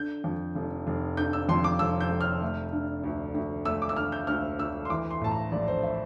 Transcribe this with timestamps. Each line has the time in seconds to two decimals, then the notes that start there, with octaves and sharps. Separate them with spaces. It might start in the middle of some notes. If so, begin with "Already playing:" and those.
Already playing: D3 G6
0.24 F2
0.55 F1
0.87 F1
1.17 D3 G6
1.33 E6
1.49 F2 C6
1.64 D6
1.79 F1 E6
2.00 G6
2.10 F1
2.21 F6
2.42 A3
2.72 D3
3.04 D2
3.34 D2
3.65 A3 E6
3.82 D6
3.89 E6
3.96 D3 F6
4.12 G6
4.27 D2 F6
4.59 D2 E6
4.85 C6
4.90 E3 D6
5.10 C6
5.21 A2 A5
5.31 A#5
5.52 A#1 D5
5.68 C5
5.83 E5